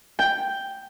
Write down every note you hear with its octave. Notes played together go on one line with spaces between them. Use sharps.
G5